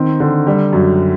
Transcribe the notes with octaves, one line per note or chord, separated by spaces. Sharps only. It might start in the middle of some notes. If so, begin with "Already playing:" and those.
Already playing: D#3 C4
D3
G3
F#2